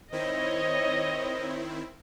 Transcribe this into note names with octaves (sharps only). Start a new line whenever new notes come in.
D#3 C4 E4 C5 C#5 D#5